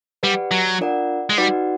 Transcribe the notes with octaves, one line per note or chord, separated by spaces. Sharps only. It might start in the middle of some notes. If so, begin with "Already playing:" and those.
G3 G4 B4 D5 F#5
F#3
D4 F4 A#4 D5 F#5
G#3
G3 D#4 F#4 B4 D5 F#5